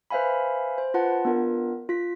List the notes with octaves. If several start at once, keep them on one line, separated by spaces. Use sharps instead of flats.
B4 C5 E5 F5 G#5 B5
C5
F4 B4 F#5 A5
B3 D4 F4 A#4
F4 B6